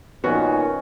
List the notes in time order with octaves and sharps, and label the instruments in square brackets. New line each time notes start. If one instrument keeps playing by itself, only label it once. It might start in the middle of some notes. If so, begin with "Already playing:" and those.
[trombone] A#2 [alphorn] D#3 [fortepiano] B3 F#4 [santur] C#4